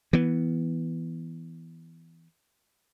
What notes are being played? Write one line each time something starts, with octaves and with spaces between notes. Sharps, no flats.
E3 B3